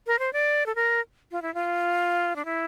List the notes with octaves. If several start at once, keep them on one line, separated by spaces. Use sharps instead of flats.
A#4
C5
D5
A4
A#4
F4
E4
F4
D4
E4